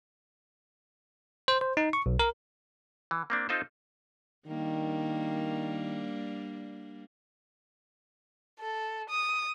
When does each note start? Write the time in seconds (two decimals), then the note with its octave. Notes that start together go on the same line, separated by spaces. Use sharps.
1.48 C5
1.61 C5
1.77 D#4
1.93 C#6
2.06 B1
2.19 A#4
3.11 E3
3.30 A#3 C4 D4
3.49 C4 D#4 F4 A4 C5
4.47 D#3 G3 A#3 D4
8.60 A4
9.09 D#6